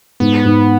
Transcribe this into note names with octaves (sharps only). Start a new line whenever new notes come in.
G#2 B3
G#2